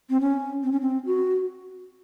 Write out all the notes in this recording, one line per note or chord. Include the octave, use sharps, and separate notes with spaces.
C4
C#4
C4
C#4
C4
F#4